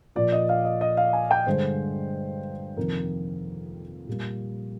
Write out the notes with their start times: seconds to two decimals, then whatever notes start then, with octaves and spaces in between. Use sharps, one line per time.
0.15 A#2 F3 A#3 D5
0.32 D#5
0.49 F5
0.65 D#5
0.81 D#5
0.97 F5
1.13 G#5
1.31 G5
1.46 G2 D3 G#3 C5
2.77 F2 C3 D#3 A#3 A#4
4.07 A#2 G3 A#3